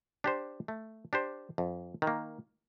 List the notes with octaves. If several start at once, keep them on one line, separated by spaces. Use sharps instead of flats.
D4 G4 C5
A3
D4 G4 C5
F2
D#3
A#3